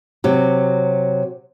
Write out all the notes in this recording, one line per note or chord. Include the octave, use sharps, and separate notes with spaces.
C3 F#3